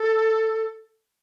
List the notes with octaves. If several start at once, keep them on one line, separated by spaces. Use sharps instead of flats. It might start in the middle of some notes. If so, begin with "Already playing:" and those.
Already playing: A4